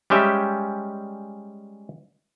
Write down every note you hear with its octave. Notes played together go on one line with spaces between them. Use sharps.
G3 G#3 C#4 G4 E5